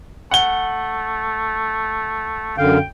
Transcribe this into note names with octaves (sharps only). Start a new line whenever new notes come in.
A3 F#5 G7
F#2 D3 F5 G5